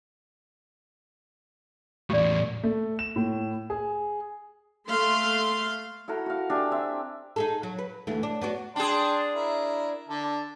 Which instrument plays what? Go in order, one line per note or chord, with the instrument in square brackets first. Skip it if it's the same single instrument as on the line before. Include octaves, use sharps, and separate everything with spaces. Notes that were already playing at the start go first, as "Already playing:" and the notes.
[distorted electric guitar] E2 A2 [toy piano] G4 D5
[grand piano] A3
E7
A2
G#4
[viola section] A3 F5 C6
[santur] E4 F#4 A4 A#4
F#4 F5
D4 G4 E5 G#5
C4 E5
[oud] D#4 G#4 A4
F#3
B4
D2 E3 A3
D4
B3 D4 F#4
[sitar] D4 G#4 [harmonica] G5 A5 C6
[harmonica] E4 A#4
D3 A4